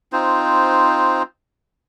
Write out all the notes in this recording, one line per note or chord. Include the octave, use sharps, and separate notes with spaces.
C4 D#4 F4 C5